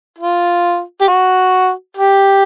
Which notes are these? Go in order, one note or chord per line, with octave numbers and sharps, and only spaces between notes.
F4
G4
F#4
G4